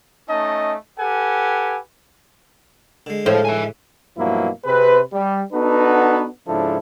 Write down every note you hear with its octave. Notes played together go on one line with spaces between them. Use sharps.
A3 C#4 D#4 D#5 A5
G4 A4 B4 F#5 G#5
D3 G#3
A2 C5 F5
E5 G#5
G2 B2 F3 F#3 A#3 E4
C3 C4 G#4 B4
G3
B3 D4 D#4 F#4 A4 B4
G#2 C#3 F3 D4 E4 A4